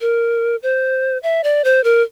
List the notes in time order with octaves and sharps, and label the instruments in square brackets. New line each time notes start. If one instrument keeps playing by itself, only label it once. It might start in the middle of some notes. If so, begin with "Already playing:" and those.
[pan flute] A#4
C5
E5
D5
C5
A#4